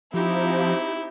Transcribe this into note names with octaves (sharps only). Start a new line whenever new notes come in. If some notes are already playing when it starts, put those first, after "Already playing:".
F3 C4 D#4 E4 G4